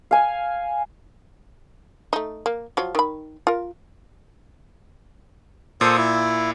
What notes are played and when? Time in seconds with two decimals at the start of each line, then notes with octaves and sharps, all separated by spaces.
0.11 F5 G#5
2.13 A3 D#4
2.46 A#3
2.77 F3 F#3
2.95 D#3 B5
3.47 F4 A#4
5.81 A#2 A4 C5 D#6
5.97 E4